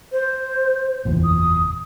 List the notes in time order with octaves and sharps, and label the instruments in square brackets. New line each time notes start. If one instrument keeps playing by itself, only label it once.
[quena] C5
[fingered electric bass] F#1 E2 A#2
[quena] D#6